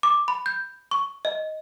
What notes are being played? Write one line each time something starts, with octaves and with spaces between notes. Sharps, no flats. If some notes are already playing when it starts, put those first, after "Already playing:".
D6
B5
G6
C#6
D#5